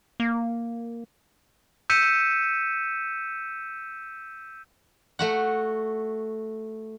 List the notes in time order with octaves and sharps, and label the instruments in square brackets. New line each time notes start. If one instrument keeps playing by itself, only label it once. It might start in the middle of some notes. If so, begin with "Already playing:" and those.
[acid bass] A#3
[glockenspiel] E6 G6 B6 C#7 D#7 E7
[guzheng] A3 F#4 F#5